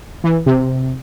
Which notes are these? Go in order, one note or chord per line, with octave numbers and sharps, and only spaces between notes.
E3
C3